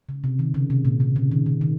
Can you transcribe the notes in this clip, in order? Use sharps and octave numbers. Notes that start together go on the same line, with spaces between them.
C#3
C3
D#3
C#3
C3
A#2
C3
C#3
D#3
D#3
D#3